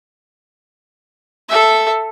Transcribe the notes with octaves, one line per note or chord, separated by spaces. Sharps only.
A4 E5